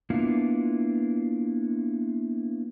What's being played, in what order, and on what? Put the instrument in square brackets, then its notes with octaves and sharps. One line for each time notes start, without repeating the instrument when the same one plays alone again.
[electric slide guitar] A#3 B3 D4 E4 F4